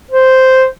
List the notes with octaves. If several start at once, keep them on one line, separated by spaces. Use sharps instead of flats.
C5